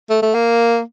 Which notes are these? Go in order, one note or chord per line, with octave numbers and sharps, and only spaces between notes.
A3
A3
A#3